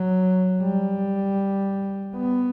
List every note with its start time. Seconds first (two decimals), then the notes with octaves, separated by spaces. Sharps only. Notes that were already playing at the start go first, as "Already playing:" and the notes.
Already playing: F#3
0.61 G3
2.16 B3